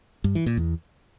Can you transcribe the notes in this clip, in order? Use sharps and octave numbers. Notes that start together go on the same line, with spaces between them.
G2
E3
A#2
E2